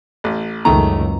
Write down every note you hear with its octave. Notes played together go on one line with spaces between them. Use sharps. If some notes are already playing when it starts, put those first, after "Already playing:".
A1
F#1 C#2 F#2 D#3 A3 A#5